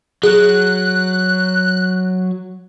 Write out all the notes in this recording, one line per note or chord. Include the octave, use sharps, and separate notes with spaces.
F#3 G#4 F#6